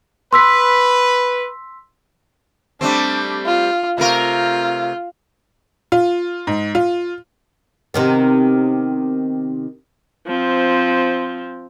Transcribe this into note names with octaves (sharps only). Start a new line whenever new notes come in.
B4 C6 E6 B6
G3 A3 C4 D4
F4
C3 A3 F4 A#4
F4
G#2
F4
C3 D#3 B3
F3 C4